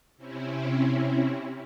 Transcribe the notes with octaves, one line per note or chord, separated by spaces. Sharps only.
C3 C4 C#4 E4